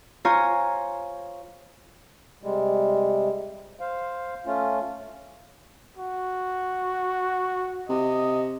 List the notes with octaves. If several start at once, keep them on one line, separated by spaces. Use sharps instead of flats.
F4 C5 C#5 G#5 A#5
C3 G3 G#3
C5 F5
A3 C#4 F4
F#4
C3 D#5